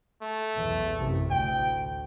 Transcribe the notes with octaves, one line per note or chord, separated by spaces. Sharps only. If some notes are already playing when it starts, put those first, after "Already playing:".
A3
B1 E2
A1 F#2 C3
D2 G5